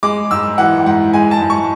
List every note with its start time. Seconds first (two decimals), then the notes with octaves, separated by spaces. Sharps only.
0.03 G#3 D6
0.31 G#2 E6
0.58 E3 F#5
0.86 G#2 F#5
1.13 G#3 G#5
1.31 A5
1.41 G#2
1.50 C#6